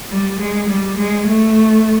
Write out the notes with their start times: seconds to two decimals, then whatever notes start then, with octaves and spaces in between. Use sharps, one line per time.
0.11 G3
0.39 G#3
0.68 G3
0.97 G#3
1.27 A3